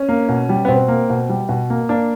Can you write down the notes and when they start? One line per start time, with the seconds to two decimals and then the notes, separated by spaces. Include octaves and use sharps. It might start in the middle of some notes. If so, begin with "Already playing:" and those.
Already playing: C#4
0.09 A#3
0.28 B2
0.49 G3
0.65 B3
0.68 B2 C4
0.88 A#3
1.10 B2
1.29 G3
1.49 B2
1.70 A#3
1.89 A#3 D4